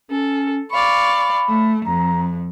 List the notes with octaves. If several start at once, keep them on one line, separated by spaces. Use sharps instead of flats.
C#4 A4
D5 F5 B5 C#6
A3
F2 A#5